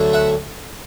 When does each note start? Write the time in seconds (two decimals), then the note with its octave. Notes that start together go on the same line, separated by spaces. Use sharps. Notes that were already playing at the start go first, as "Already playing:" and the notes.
Already playing: D2 D3 F#3 A3
0.13 E5 F#5